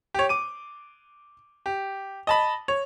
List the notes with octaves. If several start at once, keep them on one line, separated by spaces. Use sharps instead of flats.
G4 C#5
D6 D#7
G4
D#5 A5 B5
C#5